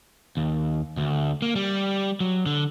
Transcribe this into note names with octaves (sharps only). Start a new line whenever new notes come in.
D#2
D2
A#3
G3
F#3
D3